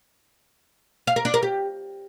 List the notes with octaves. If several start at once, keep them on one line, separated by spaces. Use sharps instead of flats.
F5
A#4
D4
A#4
G4